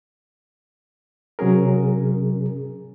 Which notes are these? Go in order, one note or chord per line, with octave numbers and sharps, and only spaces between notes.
C3 F#3 C#4 G#4 A#4